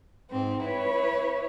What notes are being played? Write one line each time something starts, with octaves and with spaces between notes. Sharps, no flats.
G#2 C4
E4 B4 C#5